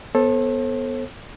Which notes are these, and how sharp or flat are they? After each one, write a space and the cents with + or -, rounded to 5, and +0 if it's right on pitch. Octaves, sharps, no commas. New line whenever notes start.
B3 +0 A4 +0 C5 +45